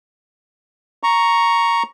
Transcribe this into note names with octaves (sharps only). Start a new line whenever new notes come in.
A#5 C#6